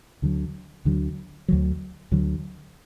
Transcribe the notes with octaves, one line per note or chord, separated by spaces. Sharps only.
D2 D3 F#3
D2 D3 F#3
D2 D3 F#3
D2 D3 F#3